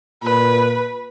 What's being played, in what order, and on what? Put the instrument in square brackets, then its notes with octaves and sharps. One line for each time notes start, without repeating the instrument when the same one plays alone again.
[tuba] A#2 [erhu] B4